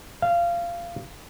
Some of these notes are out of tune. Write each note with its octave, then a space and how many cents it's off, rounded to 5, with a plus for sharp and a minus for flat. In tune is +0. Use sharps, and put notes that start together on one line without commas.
F5 -20